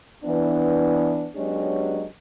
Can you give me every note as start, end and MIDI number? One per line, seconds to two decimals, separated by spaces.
0.24 1.29 52
0.24 1.29 59
0.24 1.29 62
1.36 2.04 54
1.36 2.04 56
1.36 2.04 59
1.36 2.04 61
1.36 2.04 62
1.36 2.04 67